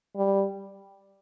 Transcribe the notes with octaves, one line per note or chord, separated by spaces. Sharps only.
G3